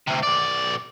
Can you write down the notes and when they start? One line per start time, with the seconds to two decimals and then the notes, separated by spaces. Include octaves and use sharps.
0.07 D2 C3
0.23 B1 D5